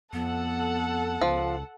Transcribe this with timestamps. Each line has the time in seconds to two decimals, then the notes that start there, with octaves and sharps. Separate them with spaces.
0.13 F2 B3 A4 F#5
1.22 C#2 F3